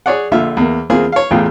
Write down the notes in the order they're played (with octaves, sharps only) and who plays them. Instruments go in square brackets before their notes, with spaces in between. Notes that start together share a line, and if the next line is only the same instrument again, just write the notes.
[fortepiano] G#4 C#5 D5 F#5
A#1 A#2 D3 F4 E5 F6
E2 A#3
E2 A#3 C4 F4 G#4
C#5 F5
A1 E2 A2 F4 G#4 G5